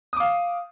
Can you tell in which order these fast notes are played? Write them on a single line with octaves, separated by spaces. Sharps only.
D#6 D6 F5